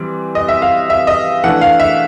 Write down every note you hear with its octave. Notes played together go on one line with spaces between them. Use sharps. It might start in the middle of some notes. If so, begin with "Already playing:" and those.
Already playing: E3 G3 C4
D#5
E5
F5
E5
D#5
E3 A3 D4 F#5
F5
E5